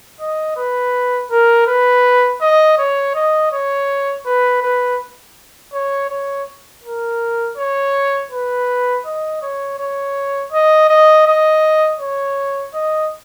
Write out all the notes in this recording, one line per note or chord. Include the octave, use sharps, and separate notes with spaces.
D#5
B4
A#4
B4
D#5
C#5
D#5
C#5
B4
B4
C#5
C#5
A#4
C#5
B4
D#5
C#5
C#5
D#5
D#5
D#5
C#5
D#5